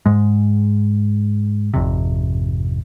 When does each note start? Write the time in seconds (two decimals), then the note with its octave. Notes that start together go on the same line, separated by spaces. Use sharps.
0.06 G#2 G#3
1.74 G#1 F2 C3